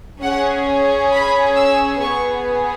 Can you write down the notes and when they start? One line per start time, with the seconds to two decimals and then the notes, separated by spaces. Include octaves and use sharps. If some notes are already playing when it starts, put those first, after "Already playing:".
0.22 C#4 G#4 F#5
1.12 B5
1.56 E6
2.01 B3 G#4 C#6